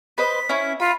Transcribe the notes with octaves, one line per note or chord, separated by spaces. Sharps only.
B4 C5 D#5 B6
C#4 E4
F4 B5